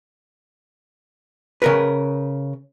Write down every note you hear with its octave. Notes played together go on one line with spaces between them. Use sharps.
C#3 A#4 B4